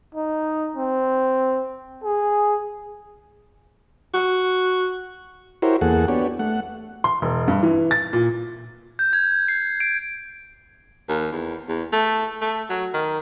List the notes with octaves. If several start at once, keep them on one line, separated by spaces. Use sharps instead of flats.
D#4
C4
G#4
F#4
E4 F#4 G4 A#4 C5 C#5
E2 A#3 G#4 A4 F#5
B3 D4 F#4 G4 C#5
A3 F#5
C6
E1
G2
E3
A6
A#2
G6
G#6
C7
D7
D#2
E2
E2
A3
A3
F#3
D#3